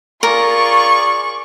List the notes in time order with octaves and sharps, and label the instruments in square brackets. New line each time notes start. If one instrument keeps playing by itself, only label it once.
[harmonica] F4 G#4 D5 [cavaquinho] A#4 [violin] C#6